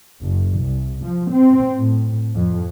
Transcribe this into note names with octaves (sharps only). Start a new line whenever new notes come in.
F#1
C2
F3
C4
A2
F2